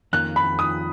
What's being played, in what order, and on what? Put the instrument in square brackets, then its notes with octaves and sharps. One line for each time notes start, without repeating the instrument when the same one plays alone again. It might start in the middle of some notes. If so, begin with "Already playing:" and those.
[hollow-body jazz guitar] F2 D#3 A#3 C#4 F4 [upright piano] F#6
[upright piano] B5
D#6